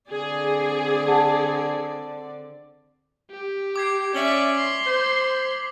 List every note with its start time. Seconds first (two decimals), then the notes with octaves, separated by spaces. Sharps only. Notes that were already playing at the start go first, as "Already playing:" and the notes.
0.10 D3 C4 G#4 D5
1.08 F#5 A5
3.30 G4
3.76 D6 G#6 C7
4.15 C#4 D5 E5 B6 F#7 G7
4.57 C6
4.86 C5